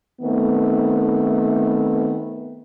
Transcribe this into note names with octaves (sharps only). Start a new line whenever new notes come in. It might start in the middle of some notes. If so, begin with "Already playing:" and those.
D#3 A3 B3 C4